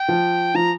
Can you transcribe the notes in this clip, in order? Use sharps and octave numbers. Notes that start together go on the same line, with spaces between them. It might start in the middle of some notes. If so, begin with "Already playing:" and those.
Already playing: G5
F3
F3 A#5